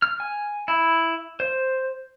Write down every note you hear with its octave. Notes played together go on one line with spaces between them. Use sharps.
F6
G#5
E4
C5